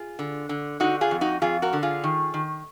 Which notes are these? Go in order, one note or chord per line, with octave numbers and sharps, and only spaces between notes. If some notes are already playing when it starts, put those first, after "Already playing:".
Already playing: F4 G#4
D3
D3
D3 D#4 F#4
F4 G#4
F2
D#4 F#4
F2 F4 G#4
F#4 A#4
D3
F4 G#4
D#3
D#3